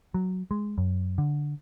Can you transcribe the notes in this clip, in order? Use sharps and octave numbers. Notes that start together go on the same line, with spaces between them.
F#3
G#3
F#2
D3